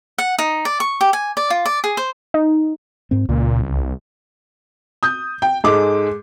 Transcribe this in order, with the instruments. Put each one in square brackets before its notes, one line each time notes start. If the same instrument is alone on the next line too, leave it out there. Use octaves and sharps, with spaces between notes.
[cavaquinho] F#5
D#4
D5
C#6
G4
G#5
D5
F4
D5
G#4
C5
[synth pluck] D#4
[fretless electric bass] G#2 C4
[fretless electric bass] C#2 [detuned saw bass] A#2
[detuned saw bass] C2
[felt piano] D#6 G6
G5
G#2 G#3 A4 D6